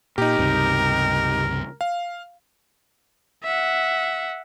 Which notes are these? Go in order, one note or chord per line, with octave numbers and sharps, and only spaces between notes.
A#2 D#4 G4 A#4
C#2 G2 C3
F5
E5 F#5